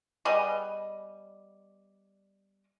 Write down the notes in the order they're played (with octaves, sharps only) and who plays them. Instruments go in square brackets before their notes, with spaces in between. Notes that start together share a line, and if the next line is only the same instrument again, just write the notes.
[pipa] G3 B3 G#4 D#5